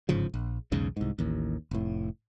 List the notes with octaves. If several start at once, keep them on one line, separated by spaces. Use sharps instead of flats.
G1 G#2 C#3 F3
A#1
B1 E2 G#2 C#3
C2 G#2
A1 D#2
F1 A2